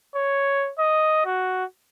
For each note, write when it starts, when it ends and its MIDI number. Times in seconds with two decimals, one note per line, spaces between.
0.15 0.71 73
0.79 1.23 75
1.26 1.64 66